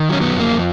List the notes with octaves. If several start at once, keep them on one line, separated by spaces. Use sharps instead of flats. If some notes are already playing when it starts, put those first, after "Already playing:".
Already playing: D#3
F#3 C#4
B3
F2
A#3
F3